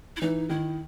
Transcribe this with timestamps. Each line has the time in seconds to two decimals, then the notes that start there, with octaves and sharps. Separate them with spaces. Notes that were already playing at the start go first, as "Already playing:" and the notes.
0.16 E4
0.21 E3 D#4
0.49 D#3 E4